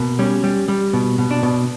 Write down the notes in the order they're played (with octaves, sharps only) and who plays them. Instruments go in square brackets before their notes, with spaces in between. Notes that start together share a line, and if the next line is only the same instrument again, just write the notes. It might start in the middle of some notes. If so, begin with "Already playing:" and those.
Already playing: [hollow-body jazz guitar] B2 A#3
G3 C#4
G3
G3
B2
B2
D4
B2